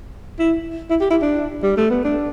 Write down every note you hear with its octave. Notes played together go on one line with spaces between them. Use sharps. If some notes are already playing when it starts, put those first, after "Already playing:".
E4
E4
G4
E4
D4
G3
A3
B3
D4